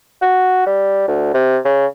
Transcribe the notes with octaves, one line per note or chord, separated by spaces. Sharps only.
F#4
G3
D2
C3
C#3